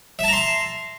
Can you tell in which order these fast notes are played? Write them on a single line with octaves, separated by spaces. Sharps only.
E5 A5 A#5 C6